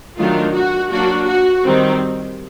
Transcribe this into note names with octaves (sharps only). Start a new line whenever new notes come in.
D#3 F#3 A3 D4 F4
F#4
F#3 A#3 D4 F#4
F#4
D#3 G3 C4